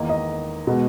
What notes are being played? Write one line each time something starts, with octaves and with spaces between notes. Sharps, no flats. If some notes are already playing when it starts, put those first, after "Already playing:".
Already playing: E2 D#3 A#3 D#4
D#5
B2 G#3 B3